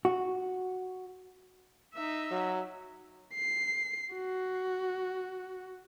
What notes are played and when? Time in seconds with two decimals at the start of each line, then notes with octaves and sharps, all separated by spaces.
0.05 F#4
1.94 D#4 E5
2.31 F#3
3.35 C7
4.15 F#4